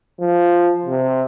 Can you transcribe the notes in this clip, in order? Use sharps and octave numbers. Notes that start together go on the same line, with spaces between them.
F3
C3